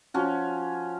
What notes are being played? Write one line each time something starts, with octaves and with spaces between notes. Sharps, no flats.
F3 C#4 F#4